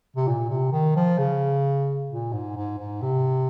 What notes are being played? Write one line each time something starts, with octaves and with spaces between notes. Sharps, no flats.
C3
A#2
C3
D#3
F3
C#3
A#2
G#2
G#2
G#2
C3